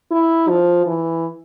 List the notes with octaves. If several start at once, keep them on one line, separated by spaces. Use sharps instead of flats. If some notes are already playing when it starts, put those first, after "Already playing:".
E4
F3
E3